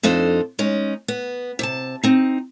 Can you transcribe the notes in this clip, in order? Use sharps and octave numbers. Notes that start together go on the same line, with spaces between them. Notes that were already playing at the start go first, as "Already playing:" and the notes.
F2 D4 D#4 A4 C5
G#3 C#4 D#4
B3
C3 D5 A5
C4 D#4